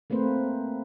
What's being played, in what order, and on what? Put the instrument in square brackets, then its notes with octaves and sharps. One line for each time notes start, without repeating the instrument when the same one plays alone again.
[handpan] A3 A#3 C4 B4 C5